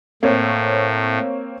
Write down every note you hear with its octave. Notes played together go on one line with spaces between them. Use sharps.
A2 A#3 C4 C#5